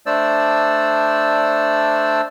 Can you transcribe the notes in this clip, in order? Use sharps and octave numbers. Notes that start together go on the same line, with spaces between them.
A3 D4 C5 D5 E6